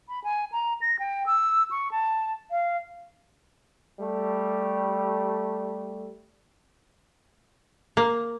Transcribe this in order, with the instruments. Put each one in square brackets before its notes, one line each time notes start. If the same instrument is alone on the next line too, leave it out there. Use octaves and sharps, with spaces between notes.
[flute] B5
G#5
A#5
A#6
G5
E6
C#6
A5
F5
[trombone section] G3 A3
[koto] A#3